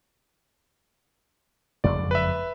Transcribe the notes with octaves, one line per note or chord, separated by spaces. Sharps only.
F#1 F2 G#3 D5
B4 E5